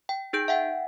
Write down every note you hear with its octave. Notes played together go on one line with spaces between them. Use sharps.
G5
D#4 G#4 G6 D7
E5 F#5 G5